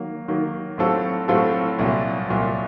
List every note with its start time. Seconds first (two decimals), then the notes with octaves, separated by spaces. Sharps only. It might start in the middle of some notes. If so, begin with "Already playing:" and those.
Already playing: D#3 F#3 A#3
0.28 D#3 F#3 A#3
0.78 A2 F#3 C4 F4 A4
1.28 A2 F#3 C4 F4 A4
1.79 C2 A#2 F#3
2.29 C2 A#2 F#3